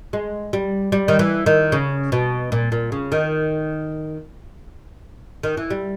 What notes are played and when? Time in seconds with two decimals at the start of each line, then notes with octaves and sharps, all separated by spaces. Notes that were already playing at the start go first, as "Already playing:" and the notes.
0.13 G#3
0.53 G3
0.92 G3
1.08 D#3
1.19 E3
1.46 D#3
1.72 C#3
2.12 B2
2.52 A#2
2.72 A#2
2.92 C#3
3.12 D#3
5.43 D#3
5.57 E3
5.70 G3